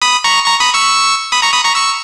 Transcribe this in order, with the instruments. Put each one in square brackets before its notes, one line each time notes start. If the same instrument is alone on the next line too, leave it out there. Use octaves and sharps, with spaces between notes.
[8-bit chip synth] B5 D#6
A#5 C#6
A#5 C#6
B5 D#6
C#6 E6
B5 D#6
A#5 C#6
B5 D#6
A#5 C#6
C#6 E6